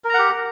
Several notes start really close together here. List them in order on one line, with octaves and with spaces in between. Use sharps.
A#4 A#5 F#5 G4